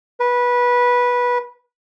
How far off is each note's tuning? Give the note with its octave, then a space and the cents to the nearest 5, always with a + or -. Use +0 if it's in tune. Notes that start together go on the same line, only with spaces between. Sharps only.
B4 -15